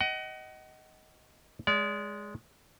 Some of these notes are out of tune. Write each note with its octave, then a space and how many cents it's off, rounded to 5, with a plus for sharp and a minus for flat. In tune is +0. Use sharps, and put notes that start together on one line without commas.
D#5 +10 F#5 +35
G#3 +0 D5 -35